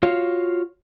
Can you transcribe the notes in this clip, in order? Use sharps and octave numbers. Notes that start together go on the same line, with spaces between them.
F4 F#4 C#5 F5